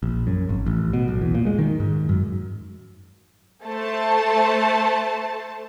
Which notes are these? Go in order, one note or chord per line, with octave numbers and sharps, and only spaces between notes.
A#1
F#2
G#1
A1
B2
B1
E2
A#2
G#3
D#3
G#2
F#2
A3 C5 A5